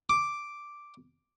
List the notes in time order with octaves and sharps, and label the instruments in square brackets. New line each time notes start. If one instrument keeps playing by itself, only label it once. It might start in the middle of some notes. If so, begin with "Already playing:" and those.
[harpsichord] D6